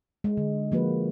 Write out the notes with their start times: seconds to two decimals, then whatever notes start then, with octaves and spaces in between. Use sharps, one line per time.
0.24 G#3
0.37 D3
0.72 F3 A#3 F#4 B4